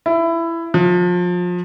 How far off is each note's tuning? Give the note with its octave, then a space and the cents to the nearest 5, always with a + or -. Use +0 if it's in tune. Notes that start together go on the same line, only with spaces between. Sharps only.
E4 +15
F3 +30